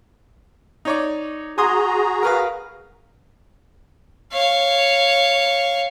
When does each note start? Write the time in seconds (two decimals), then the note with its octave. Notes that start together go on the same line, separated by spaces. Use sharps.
0.85 D#4 C#5 D5
1.58 F#4 G#4 G#5 A#5 C6 D#6
2.23 A#4 B4 F5
4.32 C#5 F5